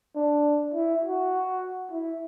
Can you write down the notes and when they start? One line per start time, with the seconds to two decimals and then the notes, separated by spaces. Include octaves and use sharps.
0.16 D4
0.74 E4
1.04 F#4
1.91 E4